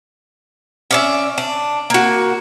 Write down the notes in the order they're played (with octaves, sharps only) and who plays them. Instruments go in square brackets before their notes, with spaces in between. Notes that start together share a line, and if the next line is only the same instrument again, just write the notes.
[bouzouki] C#4 D5 E5
D4
A#3 F#4